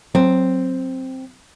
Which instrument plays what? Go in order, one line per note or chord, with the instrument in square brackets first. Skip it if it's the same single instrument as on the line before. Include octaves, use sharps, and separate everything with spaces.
[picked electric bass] F#3 [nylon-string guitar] C4